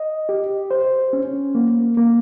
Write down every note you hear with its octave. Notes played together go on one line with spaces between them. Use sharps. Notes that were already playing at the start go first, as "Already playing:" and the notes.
Already playing: D#5
G4
C5
C#4
A#3
A#3